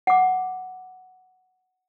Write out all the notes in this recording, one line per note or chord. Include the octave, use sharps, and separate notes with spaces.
F#5 D6